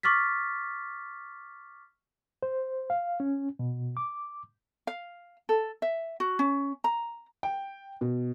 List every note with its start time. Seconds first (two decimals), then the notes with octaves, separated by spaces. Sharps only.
0.03 C#6 D6 F6 A6 B6
2.43 C5
2.90 F5
3.20 C#4
3.59 B2
3.97 D6
4.87 F5
5.49 A4
5.82 E5
6.20 F#4
6.39 C#4
6.84 A#5
7.43 G5
8.01 B2